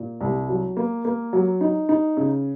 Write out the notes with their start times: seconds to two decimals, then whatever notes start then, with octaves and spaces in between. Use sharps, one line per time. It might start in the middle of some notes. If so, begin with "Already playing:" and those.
Already playing: A#2
0.21 C2
0.49 F#3
0.77 A#3
1.05 A#3
1.33 F#3
1.61 D#4
1.89 D#4
2.17 C#3